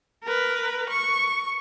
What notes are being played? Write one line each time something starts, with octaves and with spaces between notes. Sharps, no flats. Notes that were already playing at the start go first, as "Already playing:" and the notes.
A#4 B4
C#6